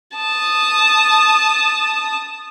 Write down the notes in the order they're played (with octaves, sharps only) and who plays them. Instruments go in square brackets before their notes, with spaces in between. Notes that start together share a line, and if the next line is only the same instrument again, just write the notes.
[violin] A5 D#6